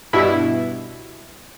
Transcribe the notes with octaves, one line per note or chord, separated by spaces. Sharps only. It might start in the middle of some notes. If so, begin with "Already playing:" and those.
G2 B2 E4